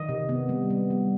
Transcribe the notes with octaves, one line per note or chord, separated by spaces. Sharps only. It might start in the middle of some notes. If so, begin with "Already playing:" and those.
Already playing: D#3 D#5
C3
B3
G3
B3
G3